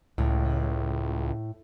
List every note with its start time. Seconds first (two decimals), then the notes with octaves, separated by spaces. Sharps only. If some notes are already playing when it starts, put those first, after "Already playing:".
0.18 C#2 A2